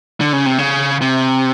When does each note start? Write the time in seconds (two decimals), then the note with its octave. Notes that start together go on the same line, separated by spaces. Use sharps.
0.21 D3
0.33 C#3
0.46 C3
0.58 C#3
1.01 C3